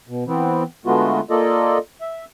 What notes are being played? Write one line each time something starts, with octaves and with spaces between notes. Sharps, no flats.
B2
E3 B3 C4
D3 G#3 A3 B3 F4 F#4
A#3 F4 A4 D5 D#5
E5